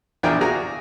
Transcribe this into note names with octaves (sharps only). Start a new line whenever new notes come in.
A#1 E2 D4 E4 A#4 G5
A#3 F#4 G#4 A#5